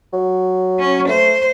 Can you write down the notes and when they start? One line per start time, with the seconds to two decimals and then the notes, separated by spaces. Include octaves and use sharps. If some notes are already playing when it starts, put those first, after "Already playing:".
0.13 F#3
0.80 C#4
1.09 A3 C5